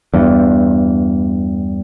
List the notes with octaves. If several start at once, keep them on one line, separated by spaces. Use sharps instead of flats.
E2 G2